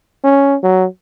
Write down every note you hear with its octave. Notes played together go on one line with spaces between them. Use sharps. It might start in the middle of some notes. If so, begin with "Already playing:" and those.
C#4
F#3